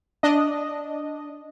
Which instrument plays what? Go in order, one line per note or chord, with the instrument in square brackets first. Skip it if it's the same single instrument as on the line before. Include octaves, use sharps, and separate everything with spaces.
[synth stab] D4 D#5